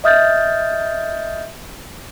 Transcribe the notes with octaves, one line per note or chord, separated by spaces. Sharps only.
D#5 E5 D#6 F6 G6 A6